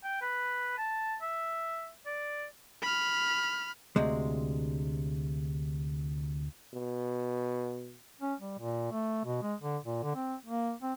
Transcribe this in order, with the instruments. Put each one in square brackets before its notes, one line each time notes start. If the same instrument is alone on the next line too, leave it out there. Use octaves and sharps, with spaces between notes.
[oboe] G5
B4
A5
E5
D5
[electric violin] B5 F6
[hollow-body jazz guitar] D2 C3 G#3
[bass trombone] B2
[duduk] C#4
G3
A#2
A3
B2
G#3
D3
A#2
D3
C4
A#3
C4